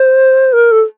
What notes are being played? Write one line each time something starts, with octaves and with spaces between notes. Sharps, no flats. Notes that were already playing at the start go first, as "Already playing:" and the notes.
Already playing: C5
A#4
A4